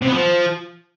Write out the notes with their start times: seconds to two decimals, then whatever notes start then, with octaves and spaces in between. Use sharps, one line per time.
0.02 C3
0.07 B3
0.13 F3